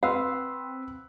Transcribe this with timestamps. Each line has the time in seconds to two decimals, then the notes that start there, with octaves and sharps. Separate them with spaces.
0.03 C4 B4 F5 F#5 B5 C6 E6